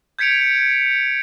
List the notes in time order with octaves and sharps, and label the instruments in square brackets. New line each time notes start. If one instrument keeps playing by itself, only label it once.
[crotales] G6 G#6 B6 C#7 D7 F7